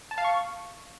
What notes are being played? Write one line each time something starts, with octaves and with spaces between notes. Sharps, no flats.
A5
F5
C#6